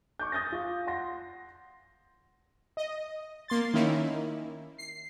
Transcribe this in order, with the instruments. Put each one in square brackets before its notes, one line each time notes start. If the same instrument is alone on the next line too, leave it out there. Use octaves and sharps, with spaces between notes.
[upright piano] C#6 D6 G6
D#6 G6 A6 A#6
F4
F#5 C6 A#6
[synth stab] D#5
A#3 C6 A6
D#3 A#3 C#4 D#4 E4
C7